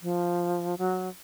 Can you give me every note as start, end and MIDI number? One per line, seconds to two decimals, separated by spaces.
0.01 0.78 53
0.78 1.09 54